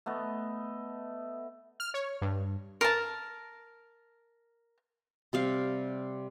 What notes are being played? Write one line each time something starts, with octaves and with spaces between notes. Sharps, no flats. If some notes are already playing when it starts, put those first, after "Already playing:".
A3 B3 D#5
F6
C#5
G2
A#4 A5
C3 G3 F5